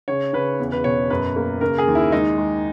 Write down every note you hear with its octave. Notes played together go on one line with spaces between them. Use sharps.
C#3 C#5
C#3 B4
E2
B4
B2 C#5
F#2 B4
A#3
C#3 A#4
G#4
D#2
E4
G#3 D#4
G#3